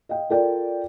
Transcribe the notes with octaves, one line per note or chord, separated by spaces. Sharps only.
D#5 F5 G5
F4 A4 A#4 D5 G5